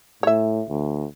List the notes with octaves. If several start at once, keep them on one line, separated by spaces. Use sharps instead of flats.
A2 C#5 E5
D2